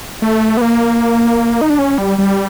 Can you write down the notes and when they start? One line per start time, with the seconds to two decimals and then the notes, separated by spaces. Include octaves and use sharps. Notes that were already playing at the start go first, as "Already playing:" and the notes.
0.22 A3
0.57 B3
0.62 A#3
1.61 D#4
1.70 D4
1.79 C#4
1.98 G3
2.18 G3